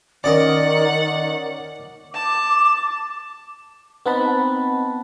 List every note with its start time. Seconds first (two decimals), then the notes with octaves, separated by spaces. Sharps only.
0.24 D#3 C#4 A#4 D5 D#5 F#5 D6
2.14 A5 D6
4.06 B3 C4 D#4 F#5 A5 B5